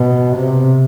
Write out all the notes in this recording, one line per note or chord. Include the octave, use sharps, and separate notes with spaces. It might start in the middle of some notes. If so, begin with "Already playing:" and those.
Already playing: B2
C3